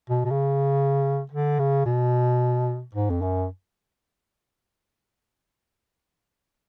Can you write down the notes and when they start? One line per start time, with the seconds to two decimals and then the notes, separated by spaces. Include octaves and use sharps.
0.10 B2
0.25 B2
0.31 C#3
1.32 D3
1.59 C#3
1.86 B2
2.94 G#2
3.10 F2
3.22 F#2